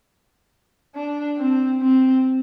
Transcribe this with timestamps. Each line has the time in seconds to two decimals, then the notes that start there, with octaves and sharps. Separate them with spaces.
0.95 D4
1.38 C4
1.81 C4